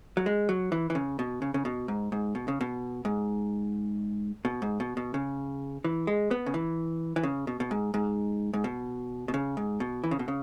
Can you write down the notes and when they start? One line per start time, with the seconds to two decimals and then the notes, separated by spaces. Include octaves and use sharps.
0.17 F#3
0.26 G#3
0.49 F#3
0.72 E3
0.90 E3
0.95 C#3
1.19 B2
1.42 C#3
1.54 C#3
1.65 B2
1.88 G#2
2.12 G#2
2.35 B2
2.48 C#3
2.61 B2
3.05 G#2
4.45 B2
4.62 G#2
4.80 B2
4.97 B2
5.14 C#3
5.84 E3
6.07 G#3
6.31 B3
6.46 C#3
6.54 E3
7.16 E3
7.23 C#3
7.47 B2
7.60 B2
7.71 G#2
7.94 G#2
8.53 G#2
8.64 B2
9.28 B2
9.34 C#3
9.57 G#2
9.80 B2
10.04 E3
10.11 C#3
10.19 B2
10.28 C#3